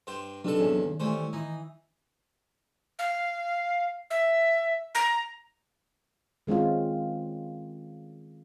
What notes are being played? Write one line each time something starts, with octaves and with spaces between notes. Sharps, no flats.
G2 C5 G5
G2 C3 F#3 D4 D#4 A4
E2 C#4 G#4
D#3
E3 G3 A3 C#4 C5
E3 D#4
F5
E5
A#5
D#3 G#3 C4 C#4 F4